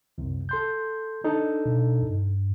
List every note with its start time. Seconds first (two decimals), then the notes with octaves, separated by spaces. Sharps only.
0.18 C2 F#2 C3
0.49 A4 C6 G6
1.24 D4 D#4 A4
1.66 B2
2.02 G2